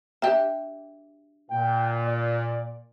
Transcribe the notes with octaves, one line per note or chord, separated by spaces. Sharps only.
D4 G4 E5
A#2 G5
D5